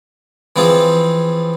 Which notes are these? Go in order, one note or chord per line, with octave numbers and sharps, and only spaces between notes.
E3 F3 C4 F4 G#4